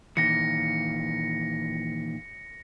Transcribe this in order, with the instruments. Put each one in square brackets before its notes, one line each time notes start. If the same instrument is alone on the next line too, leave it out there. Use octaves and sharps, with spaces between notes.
[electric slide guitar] A#2 D#3 E3 [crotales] A#6 C#7